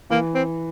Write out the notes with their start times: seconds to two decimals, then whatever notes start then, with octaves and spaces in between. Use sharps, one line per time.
0.10 E3 A#3
0.35 C4